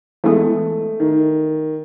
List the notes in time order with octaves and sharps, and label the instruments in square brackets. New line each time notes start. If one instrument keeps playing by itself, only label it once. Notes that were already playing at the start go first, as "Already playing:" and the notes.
[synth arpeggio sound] E3 G#3 B3 [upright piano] A3
[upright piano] D#3